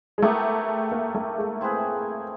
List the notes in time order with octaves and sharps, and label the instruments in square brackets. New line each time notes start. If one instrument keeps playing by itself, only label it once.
[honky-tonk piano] G#3
[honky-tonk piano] A3 [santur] B3 E4 G4 A#4
[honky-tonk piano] A#3
A3
G#3
[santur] C4 E4 G#4 B4